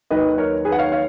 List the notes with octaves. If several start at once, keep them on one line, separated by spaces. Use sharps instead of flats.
D#2 D#3 F#3 B4 D#5
A#4 C#5
G#4 B4
F#5
C#5 F5
C#5 F5